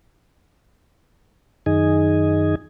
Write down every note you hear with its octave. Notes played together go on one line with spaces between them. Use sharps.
F#2 D#3 D#4 G#4 D#5 G#5